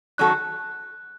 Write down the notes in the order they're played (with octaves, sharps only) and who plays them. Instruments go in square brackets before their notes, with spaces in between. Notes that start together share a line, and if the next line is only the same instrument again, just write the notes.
[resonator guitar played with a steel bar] D#3 F#3 C#4 F#4 A4 [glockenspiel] F#6